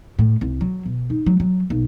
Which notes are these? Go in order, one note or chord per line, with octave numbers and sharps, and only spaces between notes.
A2
C2
F#3
B2
D#4
F#3
F#3
B1